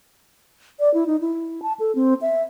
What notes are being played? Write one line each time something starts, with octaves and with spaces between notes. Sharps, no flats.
D5
E4
D#4
E4
A5
A4
C4
E5